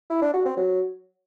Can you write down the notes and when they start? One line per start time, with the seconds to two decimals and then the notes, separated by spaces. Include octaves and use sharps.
0.10 E4
0.22 D4
0.33 F#4
0.45 C4
0.57 F#3